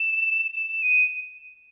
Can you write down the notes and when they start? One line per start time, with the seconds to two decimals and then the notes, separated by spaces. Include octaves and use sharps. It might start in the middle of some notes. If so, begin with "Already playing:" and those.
Already playing: E7
0.55 E7
0.69 E7
0.83 D#7